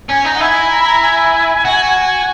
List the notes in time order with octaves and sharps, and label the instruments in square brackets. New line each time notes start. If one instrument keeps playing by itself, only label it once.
[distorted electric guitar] C#4 [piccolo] G#5
[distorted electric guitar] D#4 [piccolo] A#5
[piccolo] F#5
[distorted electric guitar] E4 [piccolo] G#5
[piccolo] A#5
B5
A#5
G#5
[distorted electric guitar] F#4